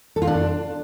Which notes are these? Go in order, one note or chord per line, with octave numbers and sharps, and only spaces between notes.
A4
F4
D4